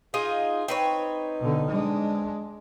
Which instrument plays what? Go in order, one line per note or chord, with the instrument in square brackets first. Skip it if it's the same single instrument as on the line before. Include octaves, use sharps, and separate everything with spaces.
[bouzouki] D#4 F4 D#5 [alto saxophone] G#4
[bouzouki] C4 B4 C#5 [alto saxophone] D#4
[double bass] B2 D3
G#3 D4